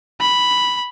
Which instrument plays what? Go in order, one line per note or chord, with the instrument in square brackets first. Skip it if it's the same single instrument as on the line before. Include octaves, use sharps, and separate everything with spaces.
[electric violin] B5